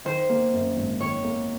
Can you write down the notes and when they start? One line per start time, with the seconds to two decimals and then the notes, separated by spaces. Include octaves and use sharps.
0.05 D#3 C5
0.29 A#3
0.53 F#2
0.76 G#1
1.00 D#3 C#5
1.24 A#3